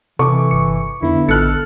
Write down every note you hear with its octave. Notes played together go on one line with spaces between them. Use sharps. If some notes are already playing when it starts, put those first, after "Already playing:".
C3 E3 A4 C#6 D6
G1 C#7
F2 D3 B3 E4
A1 A4 F6 F#6 C#7